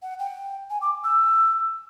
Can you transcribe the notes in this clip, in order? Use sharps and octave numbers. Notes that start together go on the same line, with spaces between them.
F#5
G5
G#5
D6
E6